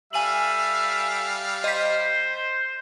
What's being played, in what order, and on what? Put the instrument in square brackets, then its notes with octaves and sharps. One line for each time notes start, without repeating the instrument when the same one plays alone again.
[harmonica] G3 F5 [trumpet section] A4 E5 [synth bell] G#5 D#7 F#7
[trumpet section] C5 [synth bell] D#5 B6